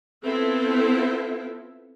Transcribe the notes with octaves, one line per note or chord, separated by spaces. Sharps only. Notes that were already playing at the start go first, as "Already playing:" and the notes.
B3 C4 E4 F4 A4 E5